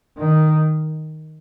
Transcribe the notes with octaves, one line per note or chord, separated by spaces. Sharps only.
D#3